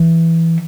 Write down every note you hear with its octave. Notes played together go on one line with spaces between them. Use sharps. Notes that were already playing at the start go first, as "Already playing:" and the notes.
Already playing: E3